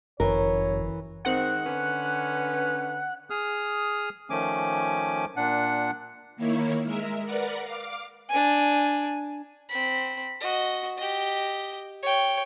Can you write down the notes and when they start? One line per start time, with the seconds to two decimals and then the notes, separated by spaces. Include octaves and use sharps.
0.20 G1 F#2 E3 A#4 C#5
1.25 D#3 G#3 C4 F#5
1.66 D3 C#4 B4
3.30 G#4 D#6 F6
4.30 D#3 F3 A3 C#4 G#5 D6
5.36 A#2 D4 F#5
6.36 D#3 A#3 E4 C#5
6.84 G#3 A#4 E5
7.25 A#4 B4 D5 F#5
7.63 F5 D6
8.29 D4 G#5
9.69 C4 B5
10.41 F#4 D#5
10.98 G4 D#5
12.02 C#5 G5